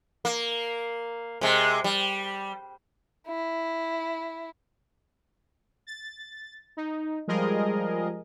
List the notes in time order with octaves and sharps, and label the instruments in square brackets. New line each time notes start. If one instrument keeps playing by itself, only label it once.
[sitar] A#3
C3 G#3
G3
[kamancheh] E4
[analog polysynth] A6
D#4
F3 G3 G#3 G#4 A#4 D#5